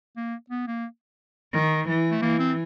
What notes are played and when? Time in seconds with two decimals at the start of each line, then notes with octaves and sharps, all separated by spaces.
0.17 A#3
0.50 B3
0.67 A#3
1.53 D#3
1.88 E3
2.11 A3
2.22 E3 A#3
2.40 C4